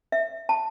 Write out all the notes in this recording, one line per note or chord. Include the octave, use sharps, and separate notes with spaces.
E5
A5